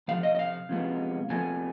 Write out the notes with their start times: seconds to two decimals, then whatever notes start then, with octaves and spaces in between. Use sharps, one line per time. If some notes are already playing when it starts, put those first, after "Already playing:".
0.08 C3 F3 F5
0.23 D#5
0.35 D#5
0.39 F5
0.69 C3 F3 G#3 B3
1.30 F2 C3 F3 B3 G#5